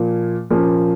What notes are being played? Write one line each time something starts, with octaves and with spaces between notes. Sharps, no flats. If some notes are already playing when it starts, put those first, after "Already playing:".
Already playing: A#2 F3 A#3
A#2 F3 A#3 C#4